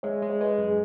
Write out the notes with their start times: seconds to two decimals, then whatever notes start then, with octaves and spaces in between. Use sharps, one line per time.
0.03 G#3 C#5 E5
0.22 G#3
0.30 C#5
0.40 G#3 B4 D#5
0.58 F#2
0.67 G#4